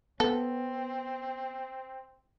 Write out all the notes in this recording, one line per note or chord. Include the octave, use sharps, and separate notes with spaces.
B3 C4 A4